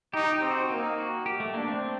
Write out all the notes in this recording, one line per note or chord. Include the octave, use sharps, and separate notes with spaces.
D#4 G4
G4
C4
F#4
A#3 D#4
F#4
G4
A3
A#3 D4
C4